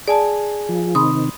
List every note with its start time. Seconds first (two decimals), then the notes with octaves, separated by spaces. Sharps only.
0.08 G#4 D5 G#5 A5
0.69 F3
0.95 C3 D#3 B5 C6 D#6